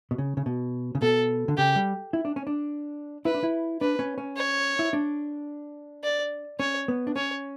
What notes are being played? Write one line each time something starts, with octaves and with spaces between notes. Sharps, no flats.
B2
C#3
C#3
B2
C#3
B2 A4
D3
C#3 G4
G3
E4
D4
C#4
D4
E4 B4
D4
E4
D4 B4
C#4
C#4
C#5
E4
D4
D5
C#4 C#5
B3
D4
C#4 C#5